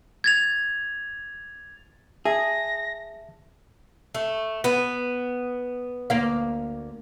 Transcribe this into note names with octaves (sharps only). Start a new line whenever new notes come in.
G#6 A6 F7
G#4 E5 A5 A#6
A3
B3
D2 A#3 F5